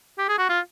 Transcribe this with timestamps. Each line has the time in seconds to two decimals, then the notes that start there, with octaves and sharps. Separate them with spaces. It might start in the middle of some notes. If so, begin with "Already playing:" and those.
0.19 G4
0.29 G#4
0.39 F#4
0.49 F4